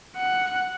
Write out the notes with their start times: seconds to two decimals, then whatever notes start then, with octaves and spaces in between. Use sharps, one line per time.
0.17 F#5